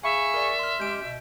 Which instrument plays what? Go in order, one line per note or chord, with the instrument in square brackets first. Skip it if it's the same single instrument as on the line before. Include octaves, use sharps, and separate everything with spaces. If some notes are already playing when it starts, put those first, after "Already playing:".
[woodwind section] G#4 G#5 C#6 [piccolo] E5 [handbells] F5 B5
[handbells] A#4 D5
C6 F6
[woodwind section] G#3 C#4 G4 [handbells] G6 D7
[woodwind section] B2